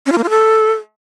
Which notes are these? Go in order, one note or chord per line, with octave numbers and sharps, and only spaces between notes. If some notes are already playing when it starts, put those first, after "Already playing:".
C#4
F4
A#3
F4
A4